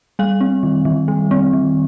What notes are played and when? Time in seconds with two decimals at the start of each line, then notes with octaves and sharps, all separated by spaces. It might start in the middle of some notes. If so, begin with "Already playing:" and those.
0.19 G3 F5
0.41 C4
0.63 D#3
0.85 D#3
1.08 G3
1.31 C4
1.53 D#3